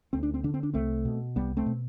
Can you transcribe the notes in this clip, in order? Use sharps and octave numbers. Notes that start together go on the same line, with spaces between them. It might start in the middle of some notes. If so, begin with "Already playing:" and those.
D2 C4
D4
C4
D3 D4
C4
D4
C2 A3 C4
B2
C2 G3 B3
A3 C4
B2